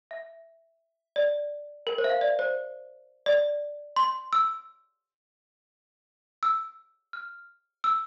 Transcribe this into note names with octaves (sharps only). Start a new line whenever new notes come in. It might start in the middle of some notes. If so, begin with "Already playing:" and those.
E5
D5
A#4
C5
E5
F5
D5
C5
D5
C6
E6
E6
F6
E6